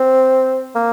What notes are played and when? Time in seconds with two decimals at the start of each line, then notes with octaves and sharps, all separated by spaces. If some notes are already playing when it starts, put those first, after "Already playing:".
Already playing: C4
0.75 A#3